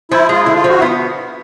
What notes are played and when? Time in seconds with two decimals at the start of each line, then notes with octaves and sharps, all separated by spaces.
0.11 F3 E4
0.29 G#3 F4
0.42 D3 E4
0.55 F4
0.64 F3 F#4
0.78 E4
0.82 B3 F4